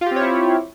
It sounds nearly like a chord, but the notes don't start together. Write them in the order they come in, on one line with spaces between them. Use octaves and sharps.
F4 G4 C4 C#5 E4